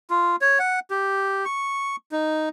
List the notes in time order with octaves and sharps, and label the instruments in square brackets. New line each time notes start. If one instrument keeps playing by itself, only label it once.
[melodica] F4
C#5
F#5
G4
C#6
D#4